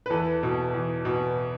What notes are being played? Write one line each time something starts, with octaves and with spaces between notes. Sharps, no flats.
B4
E2 A4
B2
E2
B2